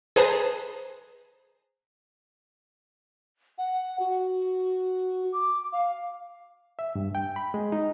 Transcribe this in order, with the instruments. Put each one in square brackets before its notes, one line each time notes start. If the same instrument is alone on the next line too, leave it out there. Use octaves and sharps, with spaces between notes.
[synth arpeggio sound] G#4 B4 C5 A5 A#5
[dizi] F#5
F#4
D6
F5
[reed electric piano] E5
G2
G5
B5
G#3
D#4